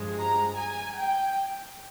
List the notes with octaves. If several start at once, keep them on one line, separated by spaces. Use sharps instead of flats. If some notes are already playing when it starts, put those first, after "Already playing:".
Already playing: G2 F3 G#3
A#5
G#5
G5